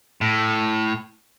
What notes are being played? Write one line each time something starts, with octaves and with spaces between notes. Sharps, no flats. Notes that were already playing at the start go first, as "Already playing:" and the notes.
A2